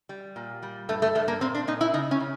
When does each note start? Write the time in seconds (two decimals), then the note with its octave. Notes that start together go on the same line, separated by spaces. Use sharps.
0.09 G3
0.36 A#2
0.62 G3
0.89 G2 A3
1.02 A3
1.15 G2 A3
1.28 A#3
1.41 A#2 C4
1.55 D4
1.67 A#2 D#4
1.81 E4
1.94 C#3 D#4
2.11 C#4
2.20 C#3